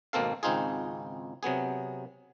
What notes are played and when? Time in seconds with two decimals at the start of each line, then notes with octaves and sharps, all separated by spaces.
0.13 G#1 B2 A#3 C4 A4 F5
0.43 G#1 C#2 C4 D#4 F4 G#4
1.43 C3 F#3 B3 G#4